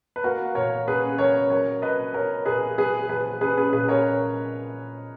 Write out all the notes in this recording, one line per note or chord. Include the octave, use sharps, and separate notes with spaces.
B4
A#3 F#4 A#4
A#2 A#4 C#5
C#4 G#4 B4
F#3 A#4 C#5
F#3 A#4 C#5
A#1 B4 D#5
B3 A#4 C#5
A#2 G#4 B4
F#3 G#4 B4
A#1 G#4 B4
C#4 G#4 B4
G#4 B4
A#2 G#4 B4
A#4 C#5